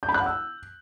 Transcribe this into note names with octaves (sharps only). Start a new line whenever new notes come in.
G6
B5
F#6
F#5
E6